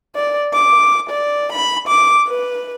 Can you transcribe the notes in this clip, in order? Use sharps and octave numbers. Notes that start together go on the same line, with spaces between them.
D5
D6
D5
B5
D6
B4